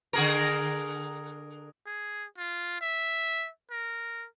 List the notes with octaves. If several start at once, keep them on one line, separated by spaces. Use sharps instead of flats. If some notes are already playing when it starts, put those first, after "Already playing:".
D3 G#4 A#4
G#4
F4
E5
A#4